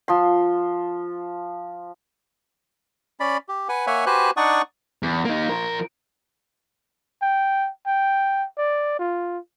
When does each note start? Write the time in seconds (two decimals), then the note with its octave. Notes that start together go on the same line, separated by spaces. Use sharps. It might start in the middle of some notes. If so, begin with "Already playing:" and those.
0.08 F3 C6
3.20 C#4 D5 B5
3.48 G4
3.69 B4 F#5 G#5
3.87 A#3 C#5 E5 F#5 G#5
4.06 F#4 G4 B4 C5 G#5 F#6
4.37 D4 D#4 D5 F#5 C#6 D#6
5.03 E2
5.25 A#3 D#4
5.48 F3 A#4
7.22 G5
7.87 G5
8.58 D5
8.99 F4